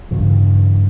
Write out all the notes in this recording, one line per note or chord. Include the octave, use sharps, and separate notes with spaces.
G2 C#3 E3